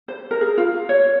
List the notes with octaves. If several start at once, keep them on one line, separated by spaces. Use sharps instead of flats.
C5
A#4
G#4
F4
C#5